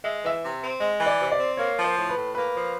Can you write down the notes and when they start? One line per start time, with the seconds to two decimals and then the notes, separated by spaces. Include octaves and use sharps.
0.04 G#3 E5
0.23 E3 E5
0.43 C3
0.61 C4
0.80 G#3 D#5
1.00 E3
1.06 D5
1.19 C3
1.32 D5
1.38 C4
1.57 A#3 C#5
1.77 F3
1.84 C5
1.97 A2
2.09 B4
2.15 A2
2.35 A#3 B4
2.54 F3